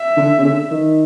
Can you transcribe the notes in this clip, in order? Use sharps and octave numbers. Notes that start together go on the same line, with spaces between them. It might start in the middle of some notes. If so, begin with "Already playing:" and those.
Already playing: E5
D3
C#3
D3
D#3